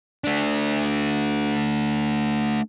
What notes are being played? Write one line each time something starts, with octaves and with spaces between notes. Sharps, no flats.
A3 D4